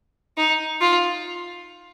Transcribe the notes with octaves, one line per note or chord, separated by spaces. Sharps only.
D#4
F4